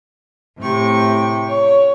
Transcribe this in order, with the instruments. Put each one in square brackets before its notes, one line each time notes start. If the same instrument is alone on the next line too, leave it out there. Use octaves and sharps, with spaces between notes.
[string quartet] A2 C3 G5 C#6
C#5